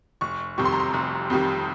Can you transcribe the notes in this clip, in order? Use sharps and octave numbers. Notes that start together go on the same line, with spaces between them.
F1 C#6
F2 C3 D#3 G3 C#6
C6
A#5
C6
F1
F2 C3 D#3 G3